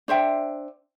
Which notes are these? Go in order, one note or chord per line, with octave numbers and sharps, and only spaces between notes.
D4 C5 E5 G5